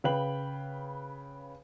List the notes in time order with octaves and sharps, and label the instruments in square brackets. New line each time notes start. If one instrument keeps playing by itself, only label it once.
[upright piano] C#3 B4 F5 G5 F#7